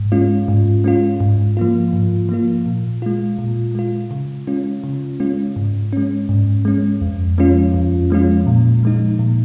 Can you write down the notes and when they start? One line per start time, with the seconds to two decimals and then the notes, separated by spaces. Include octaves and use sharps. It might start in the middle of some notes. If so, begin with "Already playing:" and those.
Already playing: G#2
0.12 G#3 C#4 F4
0.48 G#2
0.84 G#3 C#4 F4
1.20 G#2
1.57 F3 A#3 F4
1.93 G#2
2.29 F3 A#3 F4
2.66 A#2
3.02 G#3 F4
3.38 A#2
3.75 G#3 F4
4.11 C#3
4.47 G#3 C#4 F4
4.84 C#3
5.20 G#3 C#4 F4
5.56 G#2
5.93 G#3 C#4
6.29 G#2
6.65 G#3 C#4
7.01 F2
7.38 F3 G#3 C#4 F4
7.74 F2
8.10 F3 G#3 C#4 F4
8.46 A#2
8.83 F3 G#3 D#4
9.19 A#2